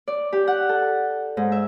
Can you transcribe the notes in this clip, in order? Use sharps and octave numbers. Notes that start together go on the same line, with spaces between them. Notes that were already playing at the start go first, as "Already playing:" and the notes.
D5
G4
F#5
A4
G#2
E5